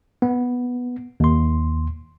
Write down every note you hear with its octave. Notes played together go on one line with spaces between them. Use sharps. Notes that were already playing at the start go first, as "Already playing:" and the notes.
B3
D#2 C6